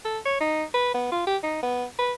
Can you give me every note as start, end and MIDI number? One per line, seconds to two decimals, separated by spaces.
0.05 0.19 69
0.25 0.36 73
0.41 0.64 63
0.74 0.94 71
0.94 1.08 59
1.12 1.23 65
1.27 1.37 67
1.43 1.62 63
1.63 1.85 59
1.99 2.13 71